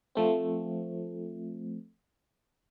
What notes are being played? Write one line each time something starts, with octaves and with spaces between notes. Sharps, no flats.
F3 A3 C4